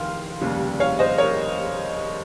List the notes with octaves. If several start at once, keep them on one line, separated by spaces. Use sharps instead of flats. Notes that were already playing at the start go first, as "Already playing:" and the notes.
Already playing: F1 D#3 F5 C6
F1 D#2 C#3 G3
C#5 F5
C5 D#5
A#4 C#5